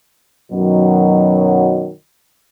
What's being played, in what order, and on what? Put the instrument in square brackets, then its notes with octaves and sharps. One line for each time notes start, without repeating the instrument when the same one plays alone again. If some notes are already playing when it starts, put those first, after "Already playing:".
[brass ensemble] F#2 B2 D#3 F#3